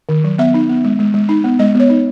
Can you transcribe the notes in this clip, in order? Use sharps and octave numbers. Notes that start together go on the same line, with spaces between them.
D#3
F#3
B3 E5
D#4
B3
G#3
G#3
G#3
D#4
B3
G#3 D#5
B3 C#5
D#4